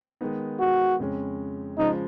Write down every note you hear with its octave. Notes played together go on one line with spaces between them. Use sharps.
D#3 G#3 B3 D#4
F#4
F2 C#3 G#3 C#4
C#3 F3 G#3 D#4